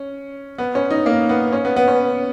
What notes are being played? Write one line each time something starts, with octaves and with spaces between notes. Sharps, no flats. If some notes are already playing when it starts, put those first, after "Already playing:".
Already playing: C#4
B3
C#4
D#4
A#3
B3
C#4
B3
B3
C#4